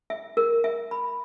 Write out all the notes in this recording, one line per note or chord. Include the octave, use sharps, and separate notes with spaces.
E5
A#4
E5
B5